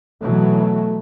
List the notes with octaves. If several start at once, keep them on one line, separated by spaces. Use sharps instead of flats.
B2 E3 F#3 A3